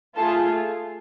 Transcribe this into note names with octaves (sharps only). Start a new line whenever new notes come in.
A3 F4 G#4 A4 A5